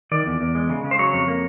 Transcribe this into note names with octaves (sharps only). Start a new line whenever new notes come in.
D#3 D5
E2
E2
G#3
C#3
C#3
C5
F#3 C#5
F2
A#3